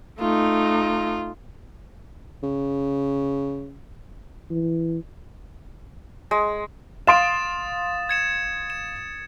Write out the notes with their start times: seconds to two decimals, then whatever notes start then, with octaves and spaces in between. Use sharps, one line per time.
0.19 A3 D#4 F4
2.43 C#3
4.50 E3
6.31 G#3
7.07 F5 C6 D#6 A6 D7 E7
8.09 G#6 C#7 E7
8.70 E7